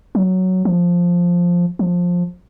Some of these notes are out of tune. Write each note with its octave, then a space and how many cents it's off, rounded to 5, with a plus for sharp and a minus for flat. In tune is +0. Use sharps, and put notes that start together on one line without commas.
F#3 +5
F3 +5
F3 +15